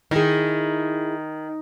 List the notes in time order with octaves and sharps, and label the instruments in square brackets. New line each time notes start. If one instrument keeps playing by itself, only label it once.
[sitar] D#3 [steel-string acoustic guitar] E4 G#4